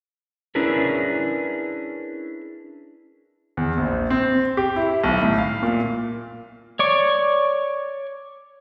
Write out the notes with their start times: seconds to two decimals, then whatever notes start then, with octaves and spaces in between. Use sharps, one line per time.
0.55 C#4 D4 E4 G#4 A#4 B4
3.57 E2
3.78 A#1
4.10 C4
4.57 G4
4.76 E4
5.04 B1
5.23 A2
5.38 F5
5.63 A#2
6.79 C#5 D5 C#6